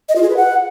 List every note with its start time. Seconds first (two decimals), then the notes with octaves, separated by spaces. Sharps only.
0.09 D#5
0.16 F4
0.23 G#4
0.30 B4
0.37 F#5